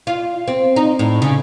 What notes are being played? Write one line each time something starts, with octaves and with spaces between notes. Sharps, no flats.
F4
C4
D#4
A2
C#3